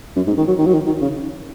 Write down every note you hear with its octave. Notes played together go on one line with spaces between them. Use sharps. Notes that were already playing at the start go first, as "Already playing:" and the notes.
F#2
G#2
D#3
F#3
D#3
F#3
D#3
D#3
C#3